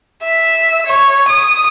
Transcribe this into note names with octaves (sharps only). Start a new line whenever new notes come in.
E5
C#5
D#6